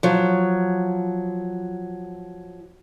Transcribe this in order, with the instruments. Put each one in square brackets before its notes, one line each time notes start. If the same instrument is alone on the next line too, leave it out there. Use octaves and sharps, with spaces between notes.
[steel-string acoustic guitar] F3 F#3